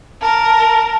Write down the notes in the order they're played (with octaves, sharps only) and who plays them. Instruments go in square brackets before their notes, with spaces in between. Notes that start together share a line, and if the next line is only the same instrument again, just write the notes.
[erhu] A#4 [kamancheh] A5